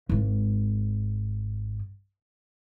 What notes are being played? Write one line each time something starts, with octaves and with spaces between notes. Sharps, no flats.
G#1 G#2